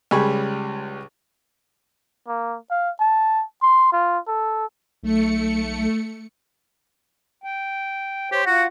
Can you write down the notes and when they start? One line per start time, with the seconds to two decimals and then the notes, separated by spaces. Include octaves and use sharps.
0.11 C#2 C#3 G3 G#5 B5 C#6
2.28 A#3
2.71 F5
3.00 A5
3.63 C6
3.92 F4
4.28 A4
5.03 B1 A3 C#7
7.44 G5
8.32 G4 C5 C#5
8.46 F4 F#4 F#5